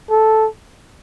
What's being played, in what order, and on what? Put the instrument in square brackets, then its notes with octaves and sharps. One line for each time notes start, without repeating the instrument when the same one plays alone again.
[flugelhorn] A4